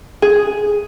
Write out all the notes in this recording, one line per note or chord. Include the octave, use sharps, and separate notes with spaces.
G#4